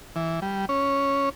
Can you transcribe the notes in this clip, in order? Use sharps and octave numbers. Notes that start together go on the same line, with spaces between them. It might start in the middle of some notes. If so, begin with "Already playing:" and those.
E3
G3
C#4